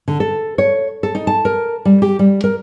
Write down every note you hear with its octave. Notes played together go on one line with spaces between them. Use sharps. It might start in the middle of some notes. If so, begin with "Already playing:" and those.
D3
A4
C#5
A4
D#4
A5
A#4
G3
G4
G3
A#4